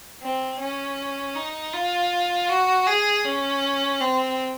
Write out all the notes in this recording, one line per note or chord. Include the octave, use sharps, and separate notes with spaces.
C4
C#4
D#4
F4
F#4
G#4
C#4
C4